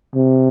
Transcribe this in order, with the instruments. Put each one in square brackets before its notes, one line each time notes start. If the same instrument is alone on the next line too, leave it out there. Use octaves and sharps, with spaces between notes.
[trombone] C3